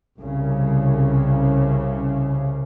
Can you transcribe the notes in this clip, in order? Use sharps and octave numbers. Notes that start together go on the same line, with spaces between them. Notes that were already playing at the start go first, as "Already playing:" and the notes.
C2 C#3